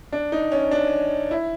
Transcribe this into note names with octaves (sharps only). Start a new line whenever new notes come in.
D4
D#4
C#4
D4
E4